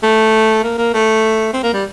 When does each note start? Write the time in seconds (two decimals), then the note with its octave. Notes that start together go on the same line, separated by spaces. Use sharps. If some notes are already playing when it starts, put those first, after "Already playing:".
0.03 A3
0.63 A#3
0.78 A#3
0.94 A3
1.53 C4
1.63 A#3
1.73 G3